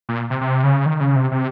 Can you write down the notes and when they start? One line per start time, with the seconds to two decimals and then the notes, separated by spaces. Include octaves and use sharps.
0.09 A#2
0.30 C3
0.41 C3
0.64 C#3
0.86 D#3
1.01 C#3
1.16 C3
1.31 C3